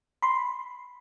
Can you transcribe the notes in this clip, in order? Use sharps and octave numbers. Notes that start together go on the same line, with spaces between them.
B5 C6